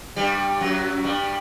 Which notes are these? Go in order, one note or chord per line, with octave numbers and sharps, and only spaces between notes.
G2 G3
F#2 F#3
G2 G3